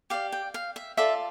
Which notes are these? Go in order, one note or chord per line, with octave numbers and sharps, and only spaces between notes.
G4 D5 F5
G5
F5
E5
F4 A4 D5 E5